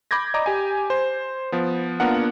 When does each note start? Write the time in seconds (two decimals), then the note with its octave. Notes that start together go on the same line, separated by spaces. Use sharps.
0.11 B5 D6 G6 G#6 A#6
0.34 D5 D#5 A#5 D6
0.46 G4 G#5
0.90 C5
1.52 F3 B3
2.00 A#3 B3 D4 F4 A#4 F#5